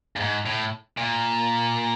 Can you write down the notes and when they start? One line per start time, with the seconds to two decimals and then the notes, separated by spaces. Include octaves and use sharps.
0.16 G2
0.20 G#2
0.46 A2
0.97 A#2